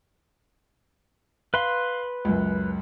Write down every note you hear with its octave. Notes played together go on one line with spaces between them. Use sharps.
B4 F5 B5 C6
C#2 F#2